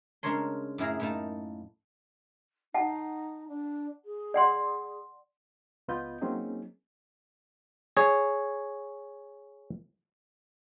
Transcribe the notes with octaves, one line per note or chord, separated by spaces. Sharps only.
C#3 G#3 D4 A#4 C#5 C6
F#2 A2 E4 G#4 F5 A#5
A2 A#3 D#4 A5
D#4 F#5 A5
D4
G#4
D5 F#5 C6
C#2 B3 F4 B4 D#5 G6
F#3 A#3 C4 C#4 D#4 G#4
G#4 C#5